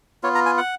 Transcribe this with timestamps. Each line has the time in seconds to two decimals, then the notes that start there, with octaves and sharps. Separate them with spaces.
0.23 B3 F4 C#5
0.35 A#5
0.46 G#5
0.57 F#5